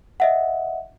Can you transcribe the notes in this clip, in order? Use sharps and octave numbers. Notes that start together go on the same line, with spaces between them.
D#5 E5 F#5